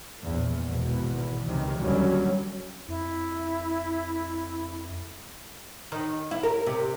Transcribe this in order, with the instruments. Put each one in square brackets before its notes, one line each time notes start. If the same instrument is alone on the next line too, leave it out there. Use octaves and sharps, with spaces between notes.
[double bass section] A#1 E2
G#1 E2 B2
C#2 C3 D#3 E3
D#2 D3 F#3 G3 C#4
[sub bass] F2 [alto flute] E4
[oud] D#3
E4
A#4
C3